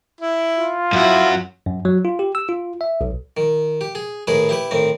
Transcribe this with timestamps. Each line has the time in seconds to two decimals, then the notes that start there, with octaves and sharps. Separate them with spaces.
0.21 E4
0.58 F4
0.93 F#2 E4 F#4
1.66 F#2
1.85 F#3
2.05 F4
2.19 G4
2.35 E6
2.49 F4
2.81 E5
3.01 B1
3.37 D#3
3.81 G4
3.95 G#4
4.27 A2 D#3 G#4 B4
4.49 E4 G4 B4
4.71 A2 D#3 C4